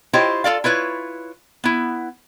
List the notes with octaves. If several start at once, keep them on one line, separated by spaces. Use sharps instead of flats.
E4 F4 G4 C5 C#5 D#5
F4 A4 D5 F5
E4 F4 B4 C#5
B3 E4